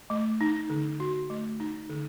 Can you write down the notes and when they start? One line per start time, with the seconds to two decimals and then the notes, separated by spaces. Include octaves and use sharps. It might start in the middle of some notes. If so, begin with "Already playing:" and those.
0.10 A3
0.41 D#4
0.70 D3
1.00 F#4
1.30 A3
1.60 D#4
1.90 D3